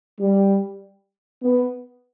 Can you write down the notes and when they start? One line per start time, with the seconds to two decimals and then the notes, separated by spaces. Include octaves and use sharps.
0.20 G3
1.43 B3